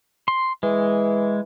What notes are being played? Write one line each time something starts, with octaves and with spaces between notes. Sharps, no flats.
C6
E3 G#3